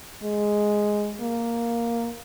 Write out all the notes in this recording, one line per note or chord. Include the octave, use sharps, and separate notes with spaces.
G#3
A#3